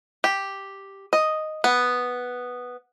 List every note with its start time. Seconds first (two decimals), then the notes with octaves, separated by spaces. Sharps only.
0.24 G4
1.13 D#5
1.64 B3